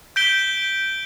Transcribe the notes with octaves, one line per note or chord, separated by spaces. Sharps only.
G6 B6 D7 G7